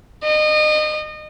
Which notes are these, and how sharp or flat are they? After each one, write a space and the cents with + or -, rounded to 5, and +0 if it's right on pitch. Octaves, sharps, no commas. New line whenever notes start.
D#5 -30